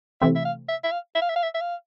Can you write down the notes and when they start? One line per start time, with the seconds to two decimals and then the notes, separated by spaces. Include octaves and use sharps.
0.21 C3 E3 A3 C4 E5
0.35 E5
0.45 F5
0.69 E5
0.84 E5
0.91 F5
1.15 E5
1.22 F5
1.29 E5
1.36 F5
1.43 E5
1.54 E5
1.61 F5